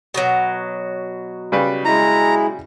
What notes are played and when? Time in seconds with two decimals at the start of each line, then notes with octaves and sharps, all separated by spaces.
0.14 B2 D#3 F#3
1.52 C#3 G3 B4
1.85 G#3 E4 A#5